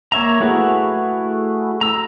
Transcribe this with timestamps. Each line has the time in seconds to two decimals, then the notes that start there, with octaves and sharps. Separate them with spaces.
0.12 A#3 C#5 E5 A#5
0.40 A3 E4 F#4 G#4 B4
1.81 A#5 E6